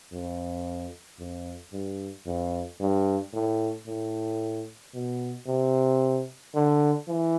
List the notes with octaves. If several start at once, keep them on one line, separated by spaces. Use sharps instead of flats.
F2
F2
G2
F2
G2
A2
A2
B2
C3
D3
E3